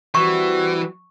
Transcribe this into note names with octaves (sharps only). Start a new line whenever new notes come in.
E3 G3 C4 F#4 C#6